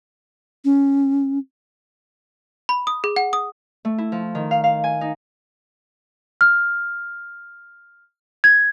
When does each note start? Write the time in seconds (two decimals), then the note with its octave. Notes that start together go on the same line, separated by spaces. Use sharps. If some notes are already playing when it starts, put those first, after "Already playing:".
0.65 C#4
2.69 B5
2.87 D#6
3.04 G#4
3.16 F#5
3.33 D#6
3.85 A3
3.98 E4
4.12 F3
4.35 D#3
4.51 F5
4.64 F5
4.84 G#5
5.01 D#4
6.41 F6
8.44 G#6